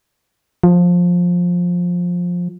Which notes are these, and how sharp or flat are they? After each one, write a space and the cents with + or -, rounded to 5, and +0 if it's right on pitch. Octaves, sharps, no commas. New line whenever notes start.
F3 +15